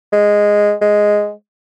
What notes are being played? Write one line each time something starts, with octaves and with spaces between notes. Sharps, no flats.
G#3
G#3